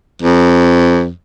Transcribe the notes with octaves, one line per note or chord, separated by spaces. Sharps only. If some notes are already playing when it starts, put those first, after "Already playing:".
F2